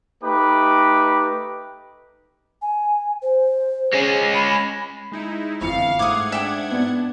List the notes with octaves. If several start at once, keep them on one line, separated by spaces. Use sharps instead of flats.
A3 D#4 G4 B4 B5 D6
G#5
C5
G#3 C#4
B5
G#3 D#4 E4
G1 F2 E3 F5 C#7
G#2 A3 F#5 D6 D#6 G#6
D4 E5 G5 D6
B3